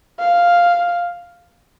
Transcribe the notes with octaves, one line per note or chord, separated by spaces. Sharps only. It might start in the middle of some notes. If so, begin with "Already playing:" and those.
F5